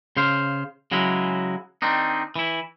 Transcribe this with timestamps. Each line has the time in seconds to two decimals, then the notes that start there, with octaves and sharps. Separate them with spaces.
0.17 C#3 C5 F5
0.91 C#3 F#3 G#3 E4
1.82 D#3 C4 D4 D#4
2.36 E3 E4